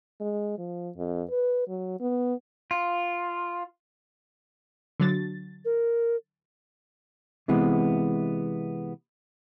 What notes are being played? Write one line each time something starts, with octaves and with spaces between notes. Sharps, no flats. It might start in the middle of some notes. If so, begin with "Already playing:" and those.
G#3
F3
F2
B4
F#3
B3
F4
D3 F#3 A6
A#4
C3 E3 G#3 B3